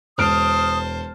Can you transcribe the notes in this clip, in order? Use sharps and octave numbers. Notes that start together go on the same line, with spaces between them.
E1 C5 A5 D#6 F6 D7